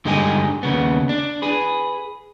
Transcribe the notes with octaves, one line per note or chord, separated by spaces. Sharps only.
G2 D3 G#3 D#4 G4 G#5
D#2 C#3 B3
D4
G#4 B4